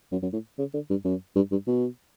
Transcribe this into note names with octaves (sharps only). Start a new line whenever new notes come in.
F#2
F#2
A2
C#3
D3
G2
F#2
G2
G2
B2